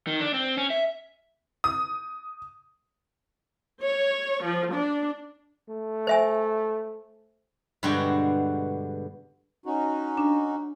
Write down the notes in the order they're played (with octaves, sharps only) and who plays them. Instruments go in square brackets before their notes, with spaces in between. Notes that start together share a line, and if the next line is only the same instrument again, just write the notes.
[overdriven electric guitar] D#3
D4
C4
C#4
E5
[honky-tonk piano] D#6
[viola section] C#5
F3
D4
[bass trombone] A3
[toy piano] C5 E5 G#5
[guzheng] G2 B2 D3 G#3 F#4 G5
[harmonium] C#4 D#4 F#4
[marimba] D4